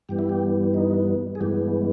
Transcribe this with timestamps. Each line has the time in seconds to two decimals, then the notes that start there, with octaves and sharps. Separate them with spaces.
0.09 G2 E3 G3 B3 G4
0.19 E4
0.29 G4
0.74 D#4
1.35 G#4
1.41 G2 E3 G#3 B3 G4